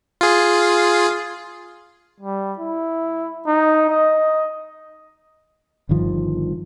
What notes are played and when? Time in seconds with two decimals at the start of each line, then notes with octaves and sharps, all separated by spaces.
0.21 F4 G#4
2.21 G3
2.59 E4
3.47 D#4
3.90 D#5
5.89 G1 G2 D#3 F3